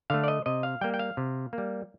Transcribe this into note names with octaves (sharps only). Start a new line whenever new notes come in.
D3 A3 F5
D5
D#5
C3 D#5
F5
G3 A#3 G5
G5
F5
C3
A#3
G3